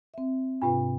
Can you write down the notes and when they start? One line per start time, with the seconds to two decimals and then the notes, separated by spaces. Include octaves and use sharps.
0.14 C4 E5
0.62 G#2 C3 D4 F4 G4 B4